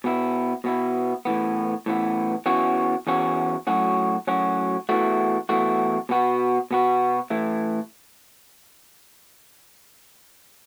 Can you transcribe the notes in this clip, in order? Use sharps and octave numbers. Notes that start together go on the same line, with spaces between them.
B2 B3 E4
B2 B3 E4
A2 E3 B3
A2 E3 B3
E2 E3 C#4 F#4
E2 E3 C#4 F#4
A2 F#3 C#4 F#4
A2 F#3 C#4 F#4
E2 E3 A3 F#4
E2 E3 A3 F#4
B2 B3 F#4
B2 B3 F#4
A2 E3 A3